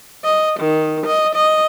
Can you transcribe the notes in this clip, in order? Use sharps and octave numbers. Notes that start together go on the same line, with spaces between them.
D#5
D#3
D#5
D#5